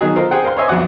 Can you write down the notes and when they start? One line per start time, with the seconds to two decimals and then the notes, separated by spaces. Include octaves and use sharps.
0.01 B2 D#3 F#3 D#4 G#4
0.16 D#4 F4 A4 A#4 C5
0.31 G4 G#4 C5 F#5 G5
0.43 A#4 C5 F5 C6
0.57 C5 C#5 D#5 E5 G#5
0.68 B1 F2 F#4 F#5 D6